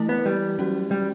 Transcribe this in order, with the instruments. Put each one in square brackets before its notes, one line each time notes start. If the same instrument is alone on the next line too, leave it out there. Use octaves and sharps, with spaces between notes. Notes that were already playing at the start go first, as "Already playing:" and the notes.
Already playing: [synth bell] E3 A3 E4
[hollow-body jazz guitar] B3
G3
[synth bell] F#3 C#4 F#4
[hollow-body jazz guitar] G3